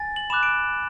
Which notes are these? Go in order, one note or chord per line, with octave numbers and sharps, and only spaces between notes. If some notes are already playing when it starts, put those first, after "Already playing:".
Already playing: G#5 A6
F#7
B5 D6 F#6 E7
D7